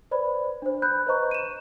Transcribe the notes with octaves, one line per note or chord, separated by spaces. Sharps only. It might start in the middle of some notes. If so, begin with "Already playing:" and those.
B4 C5 D5 B5
D4 C5
B5 F#6 G6
B4 C5 D#5 A#5 C#6
D#7 E7